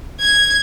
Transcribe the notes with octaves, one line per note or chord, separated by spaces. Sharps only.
G#6